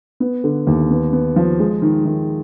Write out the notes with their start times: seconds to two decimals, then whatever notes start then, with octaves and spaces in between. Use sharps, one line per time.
0.20 B3
0.44 D3
0.67 D#2
0.90 B3
1.13 B3
1.36 F3
1.60 G#3
1.82 D#3
2.05 D#3